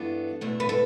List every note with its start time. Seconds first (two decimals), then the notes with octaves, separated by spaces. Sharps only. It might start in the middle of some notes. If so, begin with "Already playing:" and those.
Already playing: G2 E3 B3 D4 A4
0.41 E2 B2 A3 D4
0.60 B4
0.69 A4